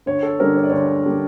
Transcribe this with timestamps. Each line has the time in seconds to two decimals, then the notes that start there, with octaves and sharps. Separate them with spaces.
0.06 D2 C#5
0.23 A4
0.39 D3 G3 A#3 D4 A#4
0.57 C#5
0.64 D5
0.70 D2 C#5
1.06 D3 G3 A#3 D4